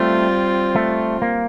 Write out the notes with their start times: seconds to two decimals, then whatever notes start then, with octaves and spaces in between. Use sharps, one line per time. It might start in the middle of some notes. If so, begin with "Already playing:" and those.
Already playing: G3 A3 C4 F4
0.76 A3
1.22 A#3